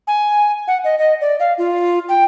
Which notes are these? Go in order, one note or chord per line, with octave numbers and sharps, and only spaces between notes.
G#5
F#5
D#5
D#5
D5
F5
F4
G5